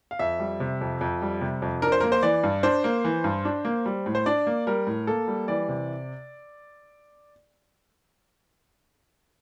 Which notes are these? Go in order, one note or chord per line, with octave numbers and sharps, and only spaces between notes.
F5
F2 E5
G3
C3
F2
F2
G3
C3
F2
D4 A#4
C5
A#3 A#4
C5
E3 D5
G2
D4 C5
A#3
E3
G2
D4
A#3
G3
A2
C5
D4 D5
A#3
G3 A#4
A2
A#3 A4
G3
E3 D5
C3